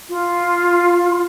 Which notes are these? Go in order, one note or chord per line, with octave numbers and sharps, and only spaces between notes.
F4